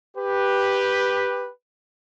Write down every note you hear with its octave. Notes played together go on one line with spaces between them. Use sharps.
G4 B4